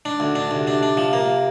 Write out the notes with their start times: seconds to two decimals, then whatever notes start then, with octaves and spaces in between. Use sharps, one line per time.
0.05 D4
0.20 D2
0.35 D4
0.51 D2 C3
0.67 D4
0.83 D4
0.97 F3
1.13 A#3